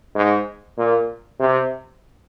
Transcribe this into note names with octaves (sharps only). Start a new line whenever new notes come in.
G#2
A#2
C3